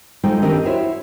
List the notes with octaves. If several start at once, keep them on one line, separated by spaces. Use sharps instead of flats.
G#3 D#4 F4 A4 C5 G5
D#3 C4 D4 G4 A#4 D#5
E4 F#4 C5 C#5 E5